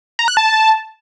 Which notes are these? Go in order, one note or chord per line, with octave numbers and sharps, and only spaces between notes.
A#5
F#6
A5